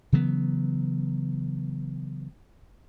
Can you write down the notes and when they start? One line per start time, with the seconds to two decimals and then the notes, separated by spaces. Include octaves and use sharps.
0.12 C#3 E3 F#3 B3